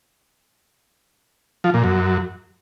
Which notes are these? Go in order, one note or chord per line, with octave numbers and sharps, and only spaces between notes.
F3
A#2
F#2